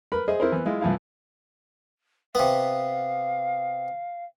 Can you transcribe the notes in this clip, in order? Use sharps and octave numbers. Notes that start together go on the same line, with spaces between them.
A#4 B4 B5
G#4 C5 D#5 E5
C4 E4 A#4 C5
E3 B3
G#3 E4 F4
C2 E3 F3 E4 F5
C3 B3 F5